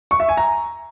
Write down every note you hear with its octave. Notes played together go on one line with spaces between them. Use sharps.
C#6
E5
G#5
A#5